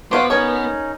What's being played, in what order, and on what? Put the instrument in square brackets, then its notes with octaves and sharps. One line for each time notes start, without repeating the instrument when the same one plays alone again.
[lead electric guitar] B3 [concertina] F#4 C6 D6 [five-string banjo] B4 C5 F5
[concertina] C#4 D#4 [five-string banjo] G#4 A#4 C#5